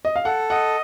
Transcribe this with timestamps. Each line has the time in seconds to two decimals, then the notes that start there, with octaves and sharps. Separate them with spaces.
0.05 D#5
0.16 F5
0.25 A4 F#5
0.50 D#5 F#5